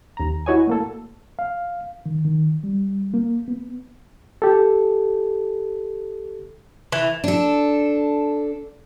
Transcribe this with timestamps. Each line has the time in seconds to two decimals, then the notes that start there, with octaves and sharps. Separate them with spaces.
0.17 D#2 A#5
0.46 E4 F#4 C#5 D#5 G#5
0.67 A2 A#3 A4
1.39 F5
2.06 D#3
2.25 D#3
2.64 G3
3.14 A#3
3.48 B3
4.42 G4 A4
6.92 E3
7.24 D4 A4